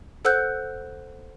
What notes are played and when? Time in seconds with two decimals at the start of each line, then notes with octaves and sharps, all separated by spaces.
0.25 A4 C5 F#5 E6 F#6 G6